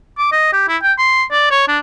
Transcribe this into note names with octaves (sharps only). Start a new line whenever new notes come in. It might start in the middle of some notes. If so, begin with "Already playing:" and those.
D6
D#5
G4
E4
G5
C6
D5
C#5
D4